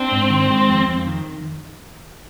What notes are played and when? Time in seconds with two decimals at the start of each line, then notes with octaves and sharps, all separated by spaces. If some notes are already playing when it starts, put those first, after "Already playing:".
Already playing: C4 D4
0.11 G#2
0.30 D#3
0.50 G#3
0.69 F2
0.88 F2
1.07 D#3